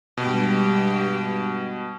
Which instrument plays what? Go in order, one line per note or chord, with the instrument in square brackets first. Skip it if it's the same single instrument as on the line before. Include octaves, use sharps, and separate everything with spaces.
[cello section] G2 G#3 G4 [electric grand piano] B2